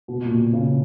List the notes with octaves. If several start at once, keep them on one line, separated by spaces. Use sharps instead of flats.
B2
A#2
B2
C#3